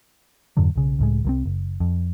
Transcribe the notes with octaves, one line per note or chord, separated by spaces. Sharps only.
F2 G#2 D3 F#3
B1 C#3
C#2 A2 G#3
C2 F3 C4
F#1
F2